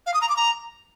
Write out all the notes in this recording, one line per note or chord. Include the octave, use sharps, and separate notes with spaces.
F5
D#6
A#5
D6
A#5